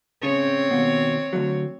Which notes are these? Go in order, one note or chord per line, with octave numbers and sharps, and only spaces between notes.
C#3 C4 C#5
D#2 B2
D2 G2 F#3